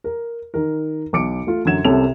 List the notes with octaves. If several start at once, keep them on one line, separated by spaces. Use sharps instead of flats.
A#4
D#3 A#4
B1 D6 C#7 D7
A3 F4
F#2 D3 F#3 G#6 E7
C2 C3 C#4 A4 F7